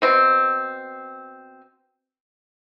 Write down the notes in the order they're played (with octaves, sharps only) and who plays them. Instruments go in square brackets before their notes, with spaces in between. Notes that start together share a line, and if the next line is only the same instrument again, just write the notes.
[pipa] B2 C4